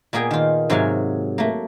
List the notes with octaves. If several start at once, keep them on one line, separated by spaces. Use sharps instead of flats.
A#2 A#3 B3 G#4 G5
D#3 F4
G#2 C3 F#3 C#5 F5 G#5
A3 A#3